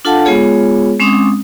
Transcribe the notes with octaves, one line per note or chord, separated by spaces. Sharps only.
D4 F4 A4 F5 F#5 A5
G#3 B3 F4 G#4 C#5
G#3 C4 C#4 D6 D#6